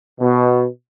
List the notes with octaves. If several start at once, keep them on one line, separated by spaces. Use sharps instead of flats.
B2